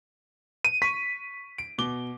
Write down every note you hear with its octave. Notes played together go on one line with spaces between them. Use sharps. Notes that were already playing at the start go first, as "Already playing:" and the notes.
D#7
C#6 B6
D7
B2 D6 G7